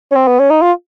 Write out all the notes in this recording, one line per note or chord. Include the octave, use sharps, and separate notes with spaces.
C#4
C4
B3
C#4
D#4
F4